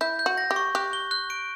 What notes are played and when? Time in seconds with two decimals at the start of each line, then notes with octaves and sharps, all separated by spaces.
0.01 E4 G6
0.19 G6
0.26 F#4
0.38 A#6
0.51 G4
0.56 C#6
0.75 G4 F#6
0.93 G7
1.11 F#6
1.30 D7